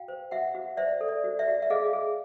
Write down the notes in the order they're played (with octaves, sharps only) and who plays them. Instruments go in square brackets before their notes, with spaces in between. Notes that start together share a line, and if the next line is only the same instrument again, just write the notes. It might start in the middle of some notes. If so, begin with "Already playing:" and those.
Already playing: [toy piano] F#4 F5 G5
C5
F#4 E5 F#5
F#4
C5 D5 E5
A4
D5
F#4
D5 E5
F#4
E5
G#4 D#5 F5
G#4